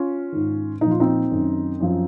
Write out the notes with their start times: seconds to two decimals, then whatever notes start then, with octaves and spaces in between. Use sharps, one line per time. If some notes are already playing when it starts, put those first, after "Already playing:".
Already playing: C#4 F4
0.32 G#2 D#3
0.81 A#2 D#4
0.86 F3 F4
1.00 C4 D#4
1.32 F#2 D#3
1.80 F#2 F3